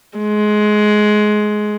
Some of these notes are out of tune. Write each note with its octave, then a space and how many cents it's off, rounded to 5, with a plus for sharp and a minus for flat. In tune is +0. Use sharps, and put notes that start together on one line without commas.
G#3 +20